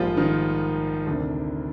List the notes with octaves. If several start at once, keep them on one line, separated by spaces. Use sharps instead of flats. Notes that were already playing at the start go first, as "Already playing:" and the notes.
Already playing: A#1 G#2 F3 G3 A#3 F4
D#3 D#4
D2 C3 D#3 A#3 D4